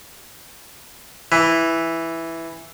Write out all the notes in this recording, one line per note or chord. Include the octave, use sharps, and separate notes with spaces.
E3